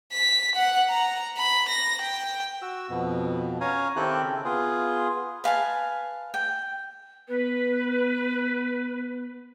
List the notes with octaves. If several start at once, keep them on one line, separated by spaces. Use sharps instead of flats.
B6
F#5
A#5
B5
A#6
G5
F#4 E6
F2 B2
C#4 C#5 F5 G#5 A#5
D#3 C4 E4 G4 A4 F#6
C#3
B3 F4 G#4
B4 F5 G#5 A5
G5
B3 B4